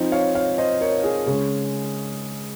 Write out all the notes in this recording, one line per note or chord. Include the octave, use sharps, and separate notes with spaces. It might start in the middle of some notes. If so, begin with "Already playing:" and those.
Already playing: F3 C4 D#4
C#5 F5
C#5 F5
C5 D#5
A#4 C#5
G#4
C#3 G#3 C#4